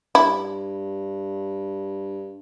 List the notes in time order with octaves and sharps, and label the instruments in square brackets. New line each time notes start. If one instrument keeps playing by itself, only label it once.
[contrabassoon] G2 [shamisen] E4